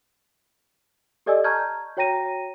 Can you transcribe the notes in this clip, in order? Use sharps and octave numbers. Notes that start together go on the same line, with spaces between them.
G4 A4 D5 D#5 G#5 E6
A5 A#5 C#6 F6 G6 G#6
F#4 C#5 G5 A#5 A#6 D#7